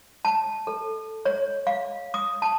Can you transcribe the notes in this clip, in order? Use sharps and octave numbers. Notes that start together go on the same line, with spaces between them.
A5
A4
C#5
F5
D#6
A5